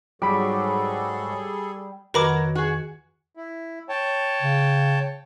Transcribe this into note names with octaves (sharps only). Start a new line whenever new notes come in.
G#2 F#3 G3 F#4 G#4 A4 B5 D6
F2 D#3 F#3 F#4 A#4 B4 B5 D6
F#4 G#4
E4
C#5 G5 A5
C#3